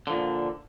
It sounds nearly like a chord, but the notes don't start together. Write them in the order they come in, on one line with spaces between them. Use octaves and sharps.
D3 F3 A#2